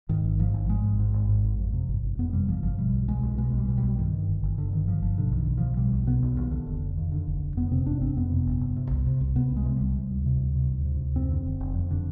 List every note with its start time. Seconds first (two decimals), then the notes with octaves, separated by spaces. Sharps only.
0.09 G#2 D#3
0.24 G#1
0.39 G#2 F3
0.54 G#1
0.69 G#2 G#3
0.84 G#1
0.99 G#2
1.14 G#1
1.29 G#2
1.44 G#1
1.59 F2
1.73 C3
1.89 G1
2.03 G1
2.19 F2 B3
2.33 C3 G3
2.48 G1 F3
2.63 G1 F3
2.78 B2 G3
2.93 B1
3.08 B2 G#3
3.23 B1
3.38 B2 G#3
3.53 B1 G3
3.68 B2
3.78 G3
3.83 B1
3.98 G2 D#3
4.12 D3
4.28 G1
4.43 G1
4.58 G2 D3
4.72 D3 D#3
4.87 G1 F3
5.02 G1 F3
5.17 B2 D3
5.32 B1
5.37 D#3
5.47 B2
5.58 B1 F3
5.77 B2 G3
5.93 B1
6.07 B2 B3
6.23 B1
6.37 D#2
6.51 D3
6.66 F1
6.82 F1
6.97 D#2
7.12 D3
7.27 F1
7.42 F1
7.57 F2 B3
7.71 C3 C4
7.86 G1 D4
8.01 G1 C4
8.16 F2 B3
8.31 C3
8.47 G1
8.61 G1
8.76 C3
8.91 C2
9.06 C3
9.21 C2
9.36 C3 B3
9.51 C2
9.56 G#3
9.66 C3
9.76 C2 G3
9.96 C3
10.11 D2
10.26 C3
10.40 D2
10.55 C3
10.71 D2
10.85 C3
11.01 D2
11.15 F2 C4
11.31 D3
11.46 F1
11.60 F1
11.75 F2
11.91 D3